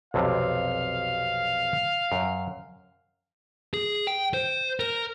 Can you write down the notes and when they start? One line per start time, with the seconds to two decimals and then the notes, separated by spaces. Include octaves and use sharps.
0.14 B1 F2 C3 F5
2.12 F#2
3.74 G#4
4.07 G5
4.34 C5
4.80 A#4